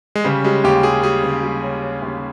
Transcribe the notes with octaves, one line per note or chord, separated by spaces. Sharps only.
G#3
C#3 G3
G3 G#3
D#2 G4
G3 G#4
G3 G#4
C#3
G3
C#4
C#4
D#2